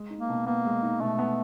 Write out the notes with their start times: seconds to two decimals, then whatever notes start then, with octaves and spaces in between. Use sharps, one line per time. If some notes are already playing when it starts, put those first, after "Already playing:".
Already playing: G#3
0.10 D#4
0.19 A#3
0.29 B2
0.46 A#3 B3
0.65 G#3
0.82 D#4
1.01 B2 A3
1.19 B3